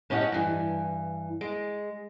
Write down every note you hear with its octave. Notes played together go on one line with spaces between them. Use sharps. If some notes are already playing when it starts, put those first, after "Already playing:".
A2 C#4 G4 D#5 F#5
G2 E3
G#3